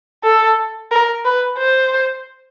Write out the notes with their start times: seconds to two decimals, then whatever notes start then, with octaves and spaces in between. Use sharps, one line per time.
0.24 A4
0.91 A#4
1.25 B4
1.58 C5